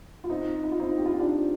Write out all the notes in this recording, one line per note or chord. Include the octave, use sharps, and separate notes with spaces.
F4
C4 D#4
D#4
F4
C4 D#4
G4
F4
D#4
D4 F4